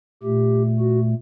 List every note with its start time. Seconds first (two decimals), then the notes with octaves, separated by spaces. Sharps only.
0.23 A#2 A3 G4
0.80 F#4